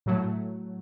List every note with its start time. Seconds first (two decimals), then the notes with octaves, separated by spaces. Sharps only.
0.06 A2 F#3 A3